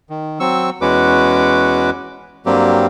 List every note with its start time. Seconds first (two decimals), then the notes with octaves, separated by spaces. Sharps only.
0.10 D#3
0.40 F#3 C4 C#6 E6
0.81 E2 G#3 C#4 F#4 B4 D6
2.46 G2 F#3 G3 A#3 C4 G4